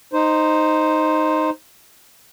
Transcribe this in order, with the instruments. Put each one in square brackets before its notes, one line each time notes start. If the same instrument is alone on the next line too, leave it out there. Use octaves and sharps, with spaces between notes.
[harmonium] D#4 C5